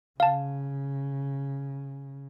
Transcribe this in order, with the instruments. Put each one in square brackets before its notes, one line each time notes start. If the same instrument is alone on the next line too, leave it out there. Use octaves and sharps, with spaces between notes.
[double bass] C#3 [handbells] F5 A5